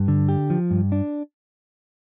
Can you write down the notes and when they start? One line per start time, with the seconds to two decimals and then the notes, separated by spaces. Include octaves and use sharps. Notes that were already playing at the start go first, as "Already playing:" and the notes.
Already playing: G2
0.08 D3
0.29 G4
0.50 F3
0.71 G2
0.92 D4